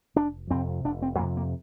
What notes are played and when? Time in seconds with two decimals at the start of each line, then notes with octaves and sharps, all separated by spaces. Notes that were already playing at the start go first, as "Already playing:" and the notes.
0.16 F1 D4
0.51 F2 C3 C4
0.85 F1 D4
1.02 C4
1.19 F2 C3 A#3
1.37 A#3